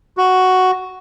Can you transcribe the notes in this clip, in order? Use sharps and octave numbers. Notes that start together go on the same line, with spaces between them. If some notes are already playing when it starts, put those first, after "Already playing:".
F#4